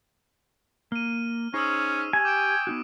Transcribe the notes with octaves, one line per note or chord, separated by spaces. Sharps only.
A#3 F6 D#7
C#4 D#4 G#4 C5 C#6 D#6 E6
G4 G#5
G5 D6 D7
B3 D#4 F#4